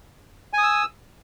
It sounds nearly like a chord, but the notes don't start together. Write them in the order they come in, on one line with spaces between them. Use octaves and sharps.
G#5 D#6 E6